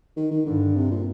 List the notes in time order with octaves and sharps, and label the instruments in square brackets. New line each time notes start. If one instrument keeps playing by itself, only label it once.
[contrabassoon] D#3
D#3
[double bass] G2 [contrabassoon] D3
[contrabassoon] C3
A#2